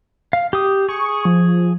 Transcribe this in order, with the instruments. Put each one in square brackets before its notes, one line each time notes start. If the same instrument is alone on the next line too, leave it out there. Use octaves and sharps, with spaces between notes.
[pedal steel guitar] F5
G4 D#6
[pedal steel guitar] G#4 [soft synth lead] C#6
[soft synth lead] F3